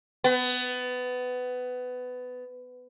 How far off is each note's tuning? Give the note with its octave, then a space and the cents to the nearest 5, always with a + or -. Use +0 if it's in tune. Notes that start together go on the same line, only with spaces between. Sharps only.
B3 +20